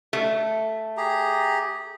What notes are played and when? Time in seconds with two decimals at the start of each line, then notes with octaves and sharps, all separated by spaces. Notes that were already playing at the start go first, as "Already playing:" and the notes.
0.13 A3
0.97 G4 G#4 A#5